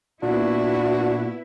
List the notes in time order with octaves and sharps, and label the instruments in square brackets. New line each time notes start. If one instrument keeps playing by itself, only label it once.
[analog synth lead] A#2 [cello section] B3 E4 [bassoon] D4 [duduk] F#4